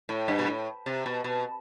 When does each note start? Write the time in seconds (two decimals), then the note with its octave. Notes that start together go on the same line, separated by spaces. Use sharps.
0.09 A2
0.28 G2
0.39 B2
0.47 A2
0.86 C3
1.06 B2
1.24 B2